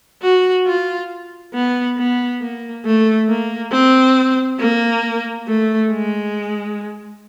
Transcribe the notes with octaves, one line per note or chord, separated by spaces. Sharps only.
F#4
F4
B3
B3
A#3
A3
A#3
C4
A#3
A3
G#3